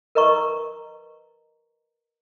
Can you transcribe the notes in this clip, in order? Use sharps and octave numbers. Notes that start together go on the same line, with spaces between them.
A#4 B4 D#5 A#5 C#6